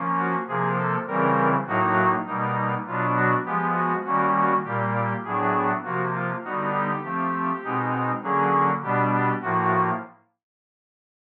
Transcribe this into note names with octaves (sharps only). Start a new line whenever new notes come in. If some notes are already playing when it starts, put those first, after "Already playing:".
Already playing: F3 A#3 C#4
F#4
C3 F3 A#3 G#4
A4
C#3 E3 G3 C4 A#4
A2 F#3 A#3 D#4 F#4
B2 G3 A#3 D#4
B2 F#3 B3 D4 F4
F#4
F3 G#3 B3 G4
F#4
D#3 G3 A#3 C#4 F#4
F#4
A#2 G3 A#3 G4
G4
A2 F#3 B3 D4 G#4
C3 F3 A#3 F#4
F4
D3 G3 B3 D#4 F#4
G4
F3 A3 C4
B2 G#3 C4 D#4
D3 F#3 A#3 C#4 G#4
B2 G3 B3 D4 G4
G4
A2 F3 A#3 F#4